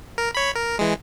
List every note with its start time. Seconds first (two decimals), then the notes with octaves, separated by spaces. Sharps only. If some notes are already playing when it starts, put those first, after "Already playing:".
0.18 A#4
0.35 C#5 B5
0.55 A#4
0.79 E3 G#3